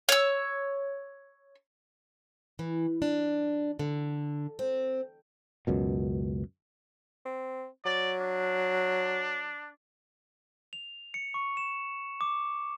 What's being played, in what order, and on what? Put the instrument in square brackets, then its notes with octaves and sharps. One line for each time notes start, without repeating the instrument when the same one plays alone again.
[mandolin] C#5 E6
[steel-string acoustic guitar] E3
D4
D3
C4
[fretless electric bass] C#2 F#2 B2
[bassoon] C4
[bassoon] F#3 [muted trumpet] D5
[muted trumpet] D4
[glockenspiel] F7
C#7
C#6
E7
D6